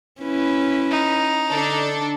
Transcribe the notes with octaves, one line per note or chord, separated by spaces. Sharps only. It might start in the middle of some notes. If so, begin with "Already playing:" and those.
C#4 E4 B4
D#4
D3 D4 A4